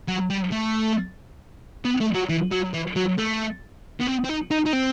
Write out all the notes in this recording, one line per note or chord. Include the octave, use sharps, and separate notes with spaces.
F#3
G3
A3
B3
A3
F#3
E3
F#3
E3
F#3
A3
B3
C4
C4
D#4
D#4
D#4
C4